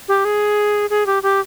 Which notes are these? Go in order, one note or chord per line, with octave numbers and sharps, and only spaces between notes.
G4
G#4
G#4
G4
G4